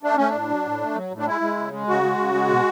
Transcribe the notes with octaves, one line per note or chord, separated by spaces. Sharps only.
A3 D4
A3 C#4
D4
A2
F#3
A2
A3
F#3
A2
D4
G#3 E4
G#3
C#3
G#3
C#3 F#4
G#3
C#3
G#3
B2